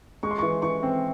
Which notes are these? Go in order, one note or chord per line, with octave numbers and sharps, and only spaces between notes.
G#3 C#6
C6
E3 C#6
E3 C#6
C4